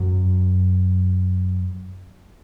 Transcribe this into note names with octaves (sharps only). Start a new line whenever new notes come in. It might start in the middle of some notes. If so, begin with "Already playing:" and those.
Already playing: F#2